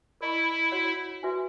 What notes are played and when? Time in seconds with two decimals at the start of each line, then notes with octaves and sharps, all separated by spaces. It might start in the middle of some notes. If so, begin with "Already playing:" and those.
0.21 E4 A#4 D#5 A#5 C#6
0.72 F#4 C#5 F#5 B5
1.23 F#4 B4 E5 G#5